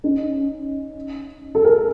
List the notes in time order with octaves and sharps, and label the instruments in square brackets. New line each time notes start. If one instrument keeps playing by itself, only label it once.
[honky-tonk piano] C#4 D#4
A4
G#4 A#4